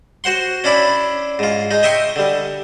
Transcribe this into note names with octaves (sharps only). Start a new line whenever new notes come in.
F#4 C5 F#5 C6
C#4 D4 E4 D5 B5
G#2 F4
G#3 D#4
D#5 E5 G5 C6 C#6
D3 G3